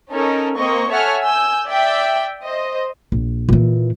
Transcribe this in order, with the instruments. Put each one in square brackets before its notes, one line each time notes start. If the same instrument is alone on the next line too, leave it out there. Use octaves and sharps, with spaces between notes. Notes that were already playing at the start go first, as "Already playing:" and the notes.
[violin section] C#4 D#4 A4 A#4
A#3 C4 D#5 C#6
A4 C#5 E5 F#5 G#5 F6
G#5 E6 G6
D5 E5 G5
C5 D#5
[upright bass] A#1
A#2 E3